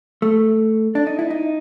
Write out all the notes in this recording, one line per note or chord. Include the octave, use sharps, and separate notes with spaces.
A3
D4
D#4
E4
D#4